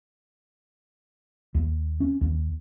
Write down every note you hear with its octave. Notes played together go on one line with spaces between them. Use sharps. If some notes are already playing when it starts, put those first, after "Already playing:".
D#2
C#4
D#2